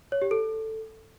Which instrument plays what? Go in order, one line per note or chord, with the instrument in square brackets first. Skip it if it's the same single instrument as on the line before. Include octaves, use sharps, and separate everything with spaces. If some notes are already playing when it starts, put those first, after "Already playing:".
[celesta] C#5
G4
A4